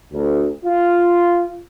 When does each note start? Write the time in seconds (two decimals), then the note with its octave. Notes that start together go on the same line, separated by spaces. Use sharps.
0.13 D2
0.64 F4